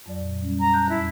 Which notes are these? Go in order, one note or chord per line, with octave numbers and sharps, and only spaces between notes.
F2 F#3 D5
A#2
G3 C#4
A#5
A5 F#6 G6
E2 E4